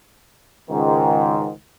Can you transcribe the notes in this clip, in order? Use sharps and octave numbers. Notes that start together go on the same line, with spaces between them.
C#2 G#2 D#3